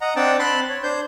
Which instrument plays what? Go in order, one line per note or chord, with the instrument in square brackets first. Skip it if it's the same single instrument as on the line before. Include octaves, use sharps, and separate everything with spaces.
[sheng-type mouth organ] D#5 F#5 A#5
C4 D4 F#5 G5 A5
C4 A5 B5 C6 F#6
C#5
D4 C5 G6